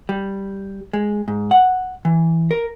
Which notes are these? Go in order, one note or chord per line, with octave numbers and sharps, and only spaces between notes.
G3
G#3
G#2
F#5
E3
A#4